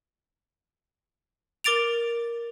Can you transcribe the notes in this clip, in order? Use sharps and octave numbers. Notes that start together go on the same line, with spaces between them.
A#4 D6 A6 D7 F7